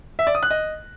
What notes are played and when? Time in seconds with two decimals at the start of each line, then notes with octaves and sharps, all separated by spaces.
0.19 E5
0.27 D5
0.35 D#6
0.43 F#6
0.51 D#5